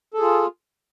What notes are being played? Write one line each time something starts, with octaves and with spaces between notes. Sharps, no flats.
F4 G#4 A4